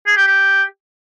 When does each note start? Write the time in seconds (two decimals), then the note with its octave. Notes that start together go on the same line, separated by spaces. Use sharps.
0.07 G#4
0.17 G4
0.27 G4